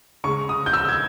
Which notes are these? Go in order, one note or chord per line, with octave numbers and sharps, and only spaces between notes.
C#3 G#3 C#6
D#6
G6
E6
G#6